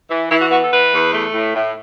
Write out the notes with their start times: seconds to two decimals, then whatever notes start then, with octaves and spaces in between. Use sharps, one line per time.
0.10 E3
0.30 E3 E4
0.40 F#4
0.51 B3 F#4
0.62 A4
0.71 E3 B4
0.92 E2
1.13 A3
1.34 A2
1.55 A2